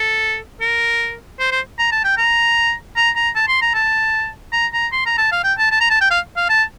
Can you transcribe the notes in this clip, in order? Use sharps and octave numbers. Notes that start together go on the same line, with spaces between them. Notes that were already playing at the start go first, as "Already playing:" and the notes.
Already playing: A4
A#4
C5
C5
A#5
A5
G5
A#5
A#5
A#5
A5
C6
A#5
A5
A#5
A#5
C6
A#5
A5
F5
G5
A5
A5
A#5
A5
G5
F5
F5
A5